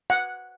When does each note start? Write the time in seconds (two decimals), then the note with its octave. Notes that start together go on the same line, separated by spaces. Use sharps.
0.10 F#5